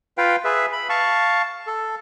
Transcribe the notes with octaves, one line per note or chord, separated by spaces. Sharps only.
F4 B4 F5 G5
G#4 B4 E5
B5
F5 A5 C#6
A4